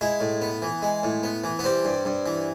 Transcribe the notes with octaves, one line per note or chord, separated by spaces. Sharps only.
G#3 E4
A2
B3
E3
G#3
A2
B3
E3
B3
G3 C4
G2
G2
E3